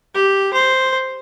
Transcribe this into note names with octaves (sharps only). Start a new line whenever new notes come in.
G4
C5